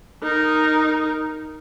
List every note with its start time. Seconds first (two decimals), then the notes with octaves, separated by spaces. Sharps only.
0.23 D#4 A#4